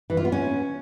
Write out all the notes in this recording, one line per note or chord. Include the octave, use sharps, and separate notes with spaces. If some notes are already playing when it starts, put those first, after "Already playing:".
E3
F4
B3
C#4